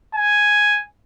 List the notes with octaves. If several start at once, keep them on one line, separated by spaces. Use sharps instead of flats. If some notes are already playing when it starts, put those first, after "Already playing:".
G#5